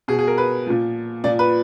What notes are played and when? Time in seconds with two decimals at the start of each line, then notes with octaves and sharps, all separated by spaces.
0.08 B2 G#4
0.19 G#4
0.27 A#4
0.38 B4
0.67 A#2 F3
1.24 A#2 F3 D5
1.39 B4